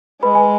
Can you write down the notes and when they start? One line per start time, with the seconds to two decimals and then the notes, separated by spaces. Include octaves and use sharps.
0.23 G#3 B4 B5
0.35 G#5